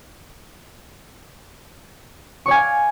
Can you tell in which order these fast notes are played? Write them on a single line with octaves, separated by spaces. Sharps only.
C#6 D5 G#5 F5